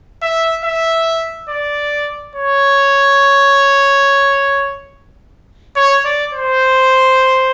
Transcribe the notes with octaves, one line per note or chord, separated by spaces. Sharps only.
E5
E5
D5
C#5
C#5
D5
C5